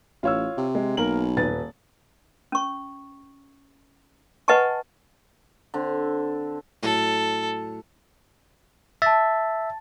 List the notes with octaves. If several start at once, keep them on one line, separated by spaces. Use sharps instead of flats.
A1 F4 C#5 E6
C3
G#3
B1 A#3 A#4 F#7
D#1 B4 A6
C#4 C#6
B4 D#5 F#5 G#5 A5 C#6
D3 C4
A2 F#3 A4
E5 A5 A6